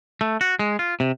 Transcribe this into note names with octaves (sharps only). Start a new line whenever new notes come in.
A3
F#4
G#3
F4
C3